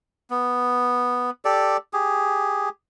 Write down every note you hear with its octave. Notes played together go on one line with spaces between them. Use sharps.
B3
G4 A4 D5
G4 G#4